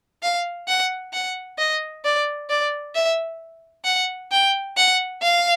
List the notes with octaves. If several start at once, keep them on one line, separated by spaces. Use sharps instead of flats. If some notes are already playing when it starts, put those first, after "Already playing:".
F5
F#5
F#5
D#5
D5
D5
E5
F#5
G5
F#5
F5